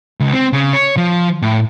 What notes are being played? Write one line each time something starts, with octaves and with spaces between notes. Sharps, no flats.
C#2
C4
C#3
C#5
F3
A2